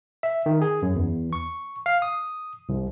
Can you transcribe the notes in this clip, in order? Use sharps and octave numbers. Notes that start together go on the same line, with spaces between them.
E5
D#3
G#4
F#2
E2
C#6
F5
D#6
C2